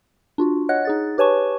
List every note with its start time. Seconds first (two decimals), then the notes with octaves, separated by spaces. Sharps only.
0.38 D4 F4 F#4
0.69 C#5 D#5 F#5 F#6
0.85 D#4 G#4 A6
1.18 G4 B4 C#5 G#5 A5 C#6